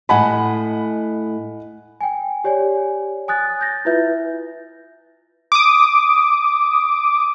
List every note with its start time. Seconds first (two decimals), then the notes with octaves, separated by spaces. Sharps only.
0.09 A2 D#5 F#5 G#5 B5
2.01 G5 G#5
2.44 G4 C#5 D5 G#5
3.28 G#5 D#6 F#6 A6
3.61 G6 A6 A#6
3.85 E4 F4 B4 E5 G6
5.52 D6 D#6